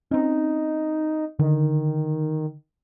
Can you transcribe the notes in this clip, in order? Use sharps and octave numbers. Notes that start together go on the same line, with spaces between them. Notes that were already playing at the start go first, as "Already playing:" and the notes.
C4 C#4 D#4
D3 D#3